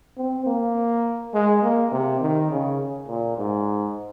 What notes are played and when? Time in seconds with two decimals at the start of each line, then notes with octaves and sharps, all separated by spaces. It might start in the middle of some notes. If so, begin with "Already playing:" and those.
0.17 C4
0.46 A#3
1.34 G#3
1.63 A#3
1.92 C3
2.21 D#3
2.51 C#3
3.08 A#2
3.37 G#2